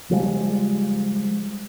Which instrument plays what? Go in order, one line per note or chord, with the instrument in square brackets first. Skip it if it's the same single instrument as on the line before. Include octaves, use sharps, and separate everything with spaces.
[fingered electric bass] C#3 F3 G3 G#3